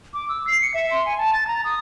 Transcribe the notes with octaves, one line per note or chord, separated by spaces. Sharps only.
D6
E6
C7
C#7
E5
C6
G#5
A5
A6
A#5
D#6